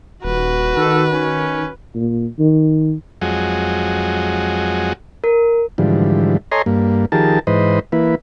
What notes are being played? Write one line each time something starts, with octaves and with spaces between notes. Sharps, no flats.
D#1 F#4 B4
D#3 A4
C#4
A#2
D#3
F2 F#3 G#3
A#4
G#2 D3 E3 F3 G3
A4 C#5 D#5 G#5 A#5 C6
G2 A#3
D#3 F3 G4 G#4 A#4 A5
G#2 E3 B4 C5 D#5
E3 A#3 E4 B4